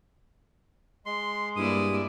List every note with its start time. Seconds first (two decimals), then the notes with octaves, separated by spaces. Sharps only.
1.06 G#3 C6
1.56 G2 A#3 E4 D5 D#6